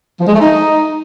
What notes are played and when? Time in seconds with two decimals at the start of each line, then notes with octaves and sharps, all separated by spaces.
0.19 F3
0.26 G#3
0.33 A3
0.41 D#4